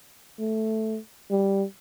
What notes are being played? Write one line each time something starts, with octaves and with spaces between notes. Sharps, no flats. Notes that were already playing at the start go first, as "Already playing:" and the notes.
A3
G3